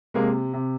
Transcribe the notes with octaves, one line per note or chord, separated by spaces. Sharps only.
C3 G#3 A#3
C3